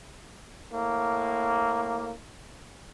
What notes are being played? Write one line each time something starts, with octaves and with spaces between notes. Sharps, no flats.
A2 A#3